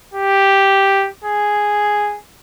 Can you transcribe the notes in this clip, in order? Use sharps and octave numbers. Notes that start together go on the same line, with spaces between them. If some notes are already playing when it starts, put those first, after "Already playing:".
G4
G#4